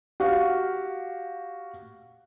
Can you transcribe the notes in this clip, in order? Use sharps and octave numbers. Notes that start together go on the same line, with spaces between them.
F#4 G4 F5